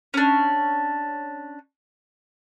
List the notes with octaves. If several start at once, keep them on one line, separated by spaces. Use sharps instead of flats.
C#4 D4